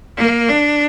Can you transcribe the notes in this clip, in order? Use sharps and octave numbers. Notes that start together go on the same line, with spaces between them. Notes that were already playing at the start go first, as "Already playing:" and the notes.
A#3
D4